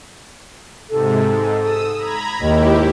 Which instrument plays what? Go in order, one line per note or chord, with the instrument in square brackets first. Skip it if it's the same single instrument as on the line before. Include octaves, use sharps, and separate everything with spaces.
[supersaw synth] G#2 C3 [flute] A4
[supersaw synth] G#2
D#6 E6
A#5 B5 G#6
[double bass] D#2 [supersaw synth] G#2 E4 G4 [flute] D#5